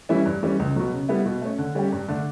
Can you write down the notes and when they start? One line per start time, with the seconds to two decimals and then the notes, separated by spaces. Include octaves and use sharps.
0.09 E3 G3 C#4 E4
0.25 G2
0.43 E3 G3 C#4
0.59 C#2
0.76 B2 F#3
0.93 C#3
1.09 G3 B3 E4
1.26 B2
1.41 A3 C#4
1.58 D3
1.75 G3 C#4 G4
1.92 G2
2.08 D3 A3 D4 A4